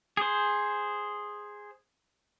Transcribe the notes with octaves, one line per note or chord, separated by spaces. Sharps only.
G#4 C5